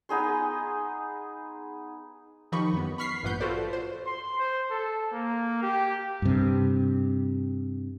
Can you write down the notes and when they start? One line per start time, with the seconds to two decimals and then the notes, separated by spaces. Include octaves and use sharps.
0.09 B3 D#4 G#4 C6
2.52 D#3 F3 D#4 G4 B5 C#6
2.73 F#2 B3
2.98 B5 C#6 F6 B6 C7
3.23 A1 G2 A#2 B3 F#5 G6
3.40 F4 F#4 A4 B4 C5 D5
3.73 C5
4.06 C6
4.39 C5
4.71 A4
5.12 A#3
5.63 G4
6.22 G2 C3